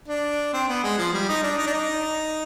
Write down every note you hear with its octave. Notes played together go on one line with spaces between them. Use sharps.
D4
C4
B3
G#3
F3
G3
D#4
D4
D#4
D4
D#4